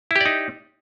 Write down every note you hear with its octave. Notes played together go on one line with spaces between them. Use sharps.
D#4 E4 G4 D5